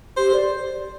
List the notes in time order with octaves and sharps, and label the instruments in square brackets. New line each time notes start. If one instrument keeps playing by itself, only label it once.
[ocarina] G4 [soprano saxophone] C5
[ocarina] D5